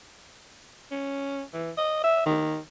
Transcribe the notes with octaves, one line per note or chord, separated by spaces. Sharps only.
C#4
E3
D#5
E5
D#3